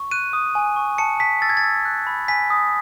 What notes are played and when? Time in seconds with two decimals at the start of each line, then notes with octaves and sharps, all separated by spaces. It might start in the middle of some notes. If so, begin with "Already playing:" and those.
Already playing: C#6
0.11 F#6 D#7
0.33 D#6
0.55 G#5
0.76 C#6
0.98 A5 C#7
1.20 A5 B6
1.42 E6 A6
1.50 G#6
1.57 A6
1.64 E6
1.85 F#6
2.07 B5
2.28 G#5 B6
2.50 D#6